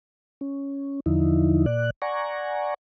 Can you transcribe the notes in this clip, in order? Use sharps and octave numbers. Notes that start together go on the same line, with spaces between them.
C#4
E2 D3 F3 D#4 E4
A#2 D5 F#6
D5 F#5 G#5 A#5 C#6